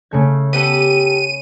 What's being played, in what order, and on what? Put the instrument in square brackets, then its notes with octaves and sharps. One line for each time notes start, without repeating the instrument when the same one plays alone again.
[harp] C#3 A3 G#6
[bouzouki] B3 G4 A4 [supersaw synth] D#7